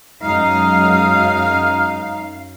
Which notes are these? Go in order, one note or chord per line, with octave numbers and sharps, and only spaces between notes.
F#2 F#3 G#3 D#4 F5 D#6 F6